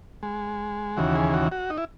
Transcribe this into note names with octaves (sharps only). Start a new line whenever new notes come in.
G#3
D#2 C#3 E3 F#4
G#4
F#4
F#4
D#4
E4